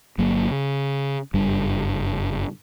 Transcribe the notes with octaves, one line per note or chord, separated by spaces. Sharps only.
G1 F#3 A#3
C#3
F#1 G2 G3